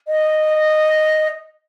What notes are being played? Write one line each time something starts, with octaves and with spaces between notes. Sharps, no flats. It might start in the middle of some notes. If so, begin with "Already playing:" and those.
D#5